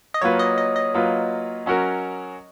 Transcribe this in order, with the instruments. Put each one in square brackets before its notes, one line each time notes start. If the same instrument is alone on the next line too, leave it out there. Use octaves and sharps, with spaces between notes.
[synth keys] D#5
[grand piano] F#3 A#3 F4 B4 [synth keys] C#5
[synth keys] D#5
D#5
D#5
[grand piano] F#3 A#3 F4 B4
F#3 C#4 F#4 A#4